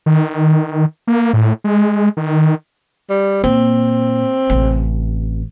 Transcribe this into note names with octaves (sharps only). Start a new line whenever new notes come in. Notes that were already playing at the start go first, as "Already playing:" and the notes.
D#3
A#3
A2
G#3
D#3
G3
A#2 C4
A1 C3